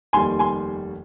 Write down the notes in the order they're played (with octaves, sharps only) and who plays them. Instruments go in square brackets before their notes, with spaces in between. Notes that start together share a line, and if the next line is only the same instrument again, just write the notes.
[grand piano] F1 D#2 D#3 G3 [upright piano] G#5 C6
[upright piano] G#5 C6